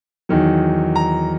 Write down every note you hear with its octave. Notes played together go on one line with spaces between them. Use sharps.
E2 D#3 F#3
A#5